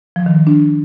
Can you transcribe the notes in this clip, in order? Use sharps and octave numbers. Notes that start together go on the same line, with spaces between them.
F3
D#3
D#3
D4